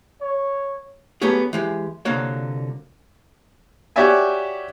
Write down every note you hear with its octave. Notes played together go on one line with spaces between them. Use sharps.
C#5
F#3 A3 B3 C#4 G4 G#4
E3 G#3 G4
C2 D3 A#3 F4 F#4 C#5
F#4 G4 C#5 D5 E5 G#5